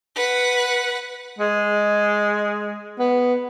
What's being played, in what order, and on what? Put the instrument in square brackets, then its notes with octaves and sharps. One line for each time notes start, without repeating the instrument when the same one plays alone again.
[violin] B4 F#5
[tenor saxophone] G#3
B3